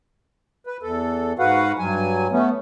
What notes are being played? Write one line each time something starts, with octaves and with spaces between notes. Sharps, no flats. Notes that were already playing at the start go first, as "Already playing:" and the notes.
B4
E2 A4
G#2 F#4 B4 F5 F#5
G2 F#3 G#5
A3 B3 C#4